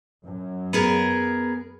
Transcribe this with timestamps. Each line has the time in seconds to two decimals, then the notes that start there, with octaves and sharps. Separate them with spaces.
0.24 F#2
0.73 B3 G#4 A#4